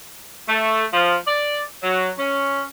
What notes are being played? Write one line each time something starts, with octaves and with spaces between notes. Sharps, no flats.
A3
F3
D5
F#3
C#4